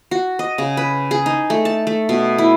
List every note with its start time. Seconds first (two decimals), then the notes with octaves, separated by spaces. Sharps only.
0.11 F#4
0.39 D#5
0.58 C#3
0.77 B4
1.11 G#4
1.26 D#4
1.50 A3
1.65 A5
1.87 A3
2.09 B2
2.38 E4